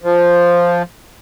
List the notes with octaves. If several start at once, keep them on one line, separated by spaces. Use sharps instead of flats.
F3